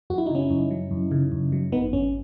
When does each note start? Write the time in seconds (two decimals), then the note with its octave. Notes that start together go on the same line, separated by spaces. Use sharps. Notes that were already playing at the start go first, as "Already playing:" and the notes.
0.10 F#2 F#4
0.18 E4
0.26 D#4
0.30 C#3 C#4 E4
0.50 F#2
0.71 F#3
0.91 F#2
1.11 C#3
1.32 F#2
1.52 F#3
1.72 G#1 B3 D#4
1.93 F#2 C#4